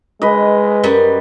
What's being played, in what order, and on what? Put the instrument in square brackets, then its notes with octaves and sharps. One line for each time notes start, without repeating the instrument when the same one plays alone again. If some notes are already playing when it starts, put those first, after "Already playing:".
[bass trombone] G#3 [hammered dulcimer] B4 D#5
[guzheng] F#2 G3